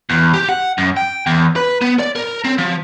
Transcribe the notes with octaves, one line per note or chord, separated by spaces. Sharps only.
E2
G4
F#5
F#2
G5
E2
B4
B3
D5
A#4
C4
F3